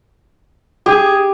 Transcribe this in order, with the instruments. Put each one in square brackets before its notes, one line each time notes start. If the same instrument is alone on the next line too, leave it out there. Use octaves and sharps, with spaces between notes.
[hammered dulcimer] G4 [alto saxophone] G#4